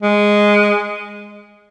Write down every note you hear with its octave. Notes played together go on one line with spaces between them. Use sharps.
G#3